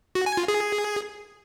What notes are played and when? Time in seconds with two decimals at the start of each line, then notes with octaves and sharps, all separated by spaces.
0.15 F#4
0.26 G#5
0.37 F4
0.48 G#4